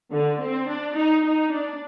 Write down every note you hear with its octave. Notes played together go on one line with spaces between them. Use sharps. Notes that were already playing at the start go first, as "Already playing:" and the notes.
D3
C4
D4
D#4
D#4
D4